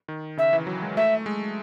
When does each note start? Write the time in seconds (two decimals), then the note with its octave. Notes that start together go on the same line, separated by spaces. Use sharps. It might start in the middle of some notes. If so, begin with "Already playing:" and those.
0.08 D#3
0.37 C#3 E5
0.53 E3
0.67 F#3
0.82 G#3
0.97 A3 E5
1.26 G#3